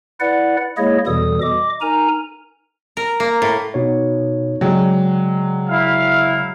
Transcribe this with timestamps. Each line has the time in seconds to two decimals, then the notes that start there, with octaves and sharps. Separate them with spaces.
0.20 E4 B4 D5 F#5
0.77 G#3 A#3 E4 G#4 C#5 D#5
1.06 E2 B2 E3 G3 A4 D#6
1.42 D#5 D6
1.81 D#4 A#4 G#5 A#5
2.97 A#4
3.20 A#3
3.42 A2
3.74 B2 D#4 C#5
4.61 C#3 F#3 G#3 D5 G5
5.70 E4 F5